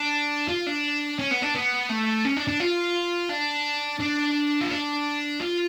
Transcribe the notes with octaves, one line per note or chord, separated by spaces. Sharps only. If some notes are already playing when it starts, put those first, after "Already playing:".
Already playing: D4
F4
D4
C#4
B3
D4
B3
A3
C#4
D4
D4
F4
D4
D4
F4
D4
F4